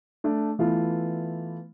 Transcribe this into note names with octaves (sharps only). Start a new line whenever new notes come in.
A3 D4
E3 A3 B3 E4 F4